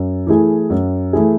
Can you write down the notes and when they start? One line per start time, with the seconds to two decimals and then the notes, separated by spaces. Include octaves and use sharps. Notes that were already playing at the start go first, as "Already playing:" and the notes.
Already playing: F#2
0.27 E3 A3 E4 G#4
0.70 F#2
1.13 E3 A3 E4 G#4